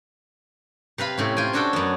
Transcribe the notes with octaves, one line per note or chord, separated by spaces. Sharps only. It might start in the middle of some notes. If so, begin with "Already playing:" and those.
C3 B4 F5 B5
A2 C3 C#4
F4 G5 G#5
C#4 D4 F#4 A4 G5
F#2 B3